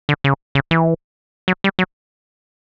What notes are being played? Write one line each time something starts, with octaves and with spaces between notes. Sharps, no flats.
D3
C#3
C#3
E3
F#3
G3
F#3